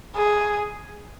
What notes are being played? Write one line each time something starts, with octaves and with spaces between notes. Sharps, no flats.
G#4